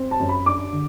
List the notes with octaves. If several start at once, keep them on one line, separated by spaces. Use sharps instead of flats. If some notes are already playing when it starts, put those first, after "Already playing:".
Already playing: C4
A5
F#2
B5
D4 D6
D3